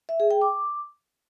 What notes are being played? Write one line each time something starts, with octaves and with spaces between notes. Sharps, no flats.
E5
G#4
G5
D6